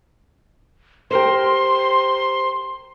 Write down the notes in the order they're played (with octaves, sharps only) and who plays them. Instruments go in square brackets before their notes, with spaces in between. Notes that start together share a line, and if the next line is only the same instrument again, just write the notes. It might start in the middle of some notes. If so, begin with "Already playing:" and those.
[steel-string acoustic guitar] G4 A#4 C5 [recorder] C6